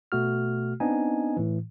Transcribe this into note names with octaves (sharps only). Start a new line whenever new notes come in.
B2 A3 F#4 F6
B3 C4 D4 D#4 D#5 G#5
A2 E3